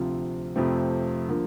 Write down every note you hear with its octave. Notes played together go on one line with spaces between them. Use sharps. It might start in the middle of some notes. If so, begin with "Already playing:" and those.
Already playing: D2 C3 F3 C4 F4
F2 C3 F3 A3 C4
D3 F3 A#3